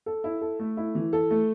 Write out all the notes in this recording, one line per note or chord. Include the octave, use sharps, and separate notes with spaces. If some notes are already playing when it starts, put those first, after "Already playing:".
A4
E4
A4
A3
E4
E3
A4
A3